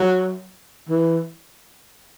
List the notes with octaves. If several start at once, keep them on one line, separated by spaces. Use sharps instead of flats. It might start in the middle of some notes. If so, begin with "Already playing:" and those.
Already playing: F#3
E3